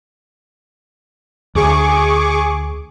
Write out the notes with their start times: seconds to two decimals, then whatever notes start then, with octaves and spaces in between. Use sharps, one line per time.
1.55 D2 G#4 C#6 D6